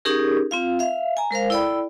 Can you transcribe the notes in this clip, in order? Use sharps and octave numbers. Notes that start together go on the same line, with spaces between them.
C#4 D#4 G4 G#4 A#4
C4 F4 F5
E5 F5
G#5 A#5
G#3 A#4 C5 F5
E4 A4 D5 G5 B5